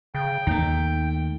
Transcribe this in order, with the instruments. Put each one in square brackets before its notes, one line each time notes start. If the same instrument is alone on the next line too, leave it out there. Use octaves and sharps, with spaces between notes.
[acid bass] C#3 [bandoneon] G5
[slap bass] D#2 A3 [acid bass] D#4